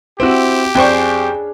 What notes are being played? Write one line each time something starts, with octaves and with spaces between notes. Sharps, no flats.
C4 E4 F#4 G4
F2 C#4 D4 G#4 C5 G5 C#6